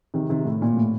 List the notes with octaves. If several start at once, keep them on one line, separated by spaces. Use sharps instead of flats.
C3 D#3
C3 D#3
A2
A#2
A2